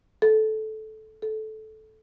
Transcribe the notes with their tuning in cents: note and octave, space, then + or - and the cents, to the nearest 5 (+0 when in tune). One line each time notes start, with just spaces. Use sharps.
A4 -15
A4 -15